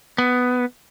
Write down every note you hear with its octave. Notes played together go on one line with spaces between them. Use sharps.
B3